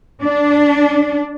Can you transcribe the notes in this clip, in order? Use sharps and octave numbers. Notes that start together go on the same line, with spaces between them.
D4